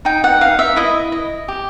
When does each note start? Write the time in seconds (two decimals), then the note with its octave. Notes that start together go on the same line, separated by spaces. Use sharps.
0.05 D#4 G5
0.24 F#5
0.41 D#4 F5
0.59 E5
0.76 E4 D#5
1.12 D#5
1.48 G4